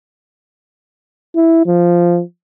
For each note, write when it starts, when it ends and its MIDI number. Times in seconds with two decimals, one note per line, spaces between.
1.36 1.62 64
1.66 2.21 53